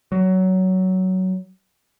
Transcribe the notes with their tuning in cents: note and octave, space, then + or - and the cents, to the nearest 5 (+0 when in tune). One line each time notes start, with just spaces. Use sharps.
F#3 +15